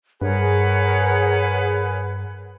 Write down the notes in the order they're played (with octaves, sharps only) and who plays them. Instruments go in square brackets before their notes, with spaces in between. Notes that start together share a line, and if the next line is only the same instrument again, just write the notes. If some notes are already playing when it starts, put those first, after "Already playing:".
[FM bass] G2 [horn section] G#4 B4 [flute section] A#4 C#5 F#5